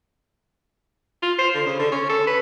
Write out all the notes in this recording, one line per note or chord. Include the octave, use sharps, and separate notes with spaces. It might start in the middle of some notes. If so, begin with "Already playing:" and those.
F4
C5
D3
C#3
D3
C#4
A4
B4